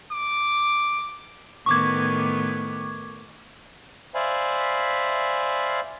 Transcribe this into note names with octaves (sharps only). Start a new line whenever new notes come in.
D6
A2 D#3 B3 C#6 D6 G#6
C5 D5 E5 F5 G#5 B5